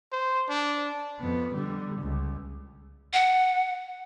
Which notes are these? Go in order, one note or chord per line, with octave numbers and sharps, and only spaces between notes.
C5
D4
F2 B3
D3 G3
C#2
F#5